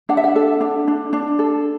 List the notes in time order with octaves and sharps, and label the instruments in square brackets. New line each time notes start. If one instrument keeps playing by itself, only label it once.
[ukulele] D4 F#5
E5
F#5
A4
D4
D4
D4
A4